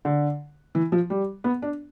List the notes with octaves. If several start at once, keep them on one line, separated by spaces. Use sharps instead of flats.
D3
E3
F3
G3
B3
D4